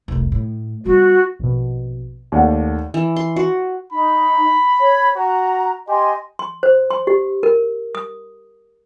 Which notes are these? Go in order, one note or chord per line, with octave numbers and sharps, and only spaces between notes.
F1 C2
A2
G3 B3 F#4
A#1 B2
D#2 A3 D5 F#5
E3
C6
F#4
D#4 B5
C#5
F#4 A#5
G4 D#5 G#5 C6
C6
C5
C6
G4
A#4
D#6